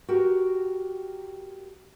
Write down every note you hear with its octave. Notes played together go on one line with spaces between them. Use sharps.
F#4 G4 A#4